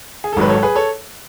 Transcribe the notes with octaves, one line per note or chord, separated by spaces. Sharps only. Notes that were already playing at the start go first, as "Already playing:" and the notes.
G#4
A4
G#1 G#2 D#3 F#3 B4
A4 C#5
G#4 B4
A4 C#5